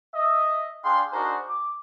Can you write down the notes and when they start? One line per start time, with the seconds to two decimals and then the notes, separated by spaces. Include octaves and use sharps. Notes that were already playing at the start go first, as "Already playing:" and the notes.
0.15 D#5 E5
0.84 D4 G#4 F5 G5 C6
1.13 D4 D#4 F#4 G#4 A#4 C5
1.48 D6